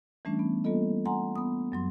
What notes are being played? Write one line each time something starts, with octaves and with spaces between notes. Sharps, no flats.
E3 G3 A3 C#4 D4
B3
G3 A#3 B3 F4 A4 D#5
F#5 G#5 A#5 C6
B3 D#6
F#2 F#3 C6